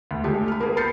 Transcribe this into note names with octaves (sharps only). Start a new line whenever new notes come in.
D2
G#3 A3 G4
B5 F6
A#3 B3 G#4
B5 F6 G6 A6 C7 C#7